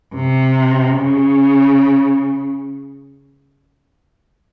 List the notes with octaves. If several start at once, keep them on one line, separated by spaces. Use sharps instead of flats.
C3
C#3